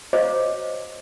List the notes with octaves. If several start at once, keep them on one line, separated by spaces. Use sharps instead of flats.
F#4 C5 C#5 D#5 F5 D6